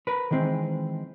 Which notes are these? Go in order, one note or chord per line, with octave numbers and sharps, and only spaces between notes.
A#4 B4
D#3 E3 G#3 C4